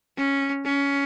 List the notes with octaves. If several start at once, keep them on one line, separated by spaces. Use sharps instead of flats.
C#4
C#4